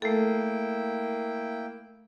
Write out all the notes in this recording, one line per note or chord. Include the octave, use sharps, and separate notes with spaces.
A3 A#3 E4 A4 G5